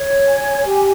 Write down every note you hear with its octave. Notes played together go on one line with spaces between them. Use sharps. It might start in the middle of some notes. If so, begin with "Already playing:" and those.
Already playing: C#5
G#5
G4